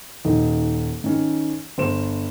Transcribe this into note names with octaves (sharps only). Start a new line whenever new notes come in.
D#1 D#4
D#3 C#4
G1 C5 E7